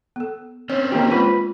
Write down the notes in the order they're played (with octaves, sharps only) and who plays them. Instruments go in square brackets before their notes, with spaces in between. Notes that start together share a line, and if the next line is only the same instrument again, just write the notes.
[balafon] B3 A4
[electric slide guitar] C4 C#4 [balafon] C#5
[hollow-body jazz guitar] A#3 D#4 G4
[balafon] G#3 A#3 F4 [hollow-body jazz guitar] B4